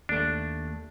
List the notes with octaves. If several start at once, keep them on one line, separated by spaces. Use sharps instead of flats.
D#2 A3 D4